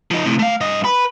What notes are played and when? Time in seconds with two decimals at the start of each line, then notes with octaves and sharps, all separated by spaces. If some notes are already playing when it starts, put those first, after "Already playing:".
0.11 F3 D#4
0.25 A2 C3
0.39 A3 F5
0.61 G2 D#5
0.85 B4